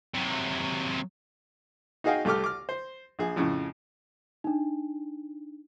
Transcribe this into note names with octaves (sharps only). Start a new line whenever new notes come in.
C3 F#3
D#4 F#4 G#4 D#5 F5 G5
C2 A3 G4 A4 D6 F6
D6 F6
C5
A#1 G#4
F2 A2 C#3
D4 D#4